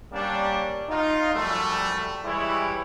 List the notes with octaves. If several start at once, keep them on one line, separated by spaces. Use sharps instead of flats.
G3 A#3 C#4 D4
D#4 F4
F#2 F3 G3 A3
E3 G3 G#3 E4 G4 C#5